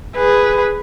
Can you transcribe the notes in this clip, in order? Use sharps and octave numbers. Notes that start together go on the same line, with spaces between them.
G#4 B4